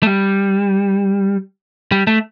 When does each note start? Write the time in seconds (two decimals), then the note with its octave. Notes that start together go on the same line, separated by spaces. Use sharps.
0.03 A3
0.07 G3
1.92 G3
2.07 A3